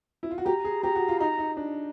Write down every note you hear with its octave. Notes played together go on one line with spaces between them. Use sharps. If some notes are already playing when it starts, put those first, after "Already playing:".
E4
F4
F#4
G4 A#5
G#4
G4 A#5
F#4
F4
D#4 A#5
D#4
D4